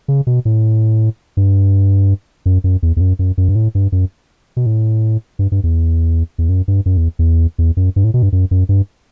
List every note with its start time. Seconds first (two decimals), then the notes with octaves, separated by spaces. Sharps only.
0.08 C#3
0.27 B2
0.45 A2
1.37 G2
2.46 F#2
2.64 F#2
2.83 E2
2.96 E2
3.01 F#2
3.19 F#2
3.38 F#2
3.49 G2
3.55 A2
3.75 G2
3.92 F#2
4.57 B2
4.66 A2
5.39 G2
5.52 G2
5.63 E2
6.38 E2
6.49 F#2
6.68 G2
6.86 F#2
6.97 E2
7.19 E2
7.58 E2
7.77 F#2
7.96 G2
8.04 A2
8.14 B2
8.23 G2
8.32 F#2
8.51 F#2
8.69 G2